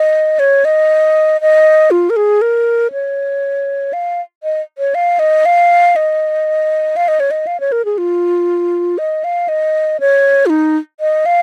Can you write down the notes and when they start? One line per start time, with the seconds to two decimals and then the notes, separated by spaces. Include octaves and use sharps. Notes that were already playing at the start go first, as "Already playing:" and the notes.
Already playing: D#5
0.39 C#5
0.65 D#5
1.41 D#5
1.91 F4
2.10 A#4
2.16 G#4
2.42 A#4
2.92 C#5
3.93 F5
4.43 D#5
4.78 C#5
4.95 F5
5.19 D#5
5.45 F5
5.96 D#5
6.96 F5
7.08 D#5
7.20 C#5
7.31 D#5
7.47 F5
7.60 C#5
7.72 A#4
7.85 G#4
7.98 F4
8.98 D#5
9.24 F5
9.49 D#5
10.00 C#5
10.46 F4
10.50 D#4
11.00 D#5
11.26 F5